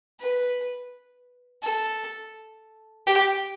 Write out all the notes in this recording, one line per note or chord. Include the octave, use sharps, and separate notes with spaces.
B4
A4
G4